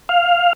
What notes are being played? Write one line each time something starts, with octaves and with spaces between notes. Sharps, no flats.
F5